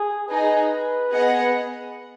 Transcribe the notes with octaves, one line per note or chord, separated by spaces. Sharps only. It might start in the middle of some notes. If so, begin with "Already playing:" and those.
Already playing: G#4
D#4 G#4 B4 D#5
B3 G#4 D#5 F#5